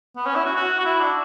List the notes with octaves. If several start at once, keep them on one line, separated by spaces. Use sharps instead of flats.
B3
C#4
E4
F#4
F#4
F#4
E4
D4